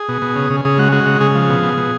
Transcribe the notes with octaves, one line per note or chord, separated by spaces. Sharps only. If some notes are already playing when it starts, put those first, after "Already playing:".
Already playing: G#4
B2
B2
C#3
C#3
C#3 G#4
G#3 F#4
G#3 F#4
C#3
C#3 G#4
F3
B2
B2
B2